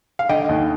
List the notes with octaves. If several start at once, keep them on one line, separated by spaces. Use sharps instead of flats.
F5
D3 D#5 G5
D#2